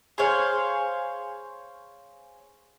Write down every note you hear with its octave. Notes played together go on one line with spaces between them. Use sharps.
G#4 C5 C#5 F5